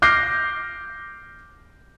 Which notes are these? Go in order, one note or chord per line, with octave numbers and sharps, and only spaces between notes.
D6 F6 G6 A#6 C7